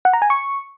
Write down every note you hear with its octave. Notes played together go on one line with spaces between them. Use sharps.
F#5
A#5
G#5
C#6